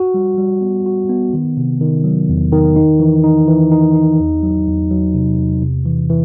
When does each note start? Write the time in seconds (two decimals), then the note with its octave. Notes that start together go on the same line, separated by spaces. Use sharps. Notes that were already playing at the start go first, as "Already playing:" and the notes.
Already playing: F#4
0.14 G3
0.38 G3
0.61 B3
0.86 F#4
1.09 B3
1.33 D#3
1.57 C3
1.81 D#3
2.04 F#3
2.29 E2
2.52 D#3
2.76 D#4
3.00 E3
3.24 D#4
3.48 E3
3.72 D#4
3.95 D#4
4.19 E2
4.43 F#3
4.67 E2
4.91 F#3
5.15 C3
5.38 E2
5.62 C3
5.85 E3
6.10 E3